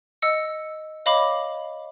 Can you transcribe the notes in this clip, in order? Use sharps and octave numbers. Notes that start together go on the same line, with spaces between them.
D#5 E6 C#7
C#5 D#5 F5 B5 D6